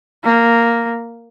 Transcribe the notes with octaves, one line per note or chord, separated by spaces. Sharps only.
A#3